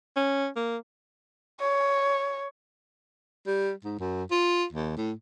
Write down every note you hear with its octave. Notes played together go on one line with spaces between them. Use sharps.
C#4
A#3
C#5
G3
G#2
F#2
F4
D#2
A2